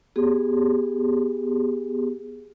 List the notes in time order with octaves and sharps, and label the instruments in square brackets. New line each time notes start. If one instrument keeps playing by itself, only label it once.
[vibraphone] B3 G4 G#4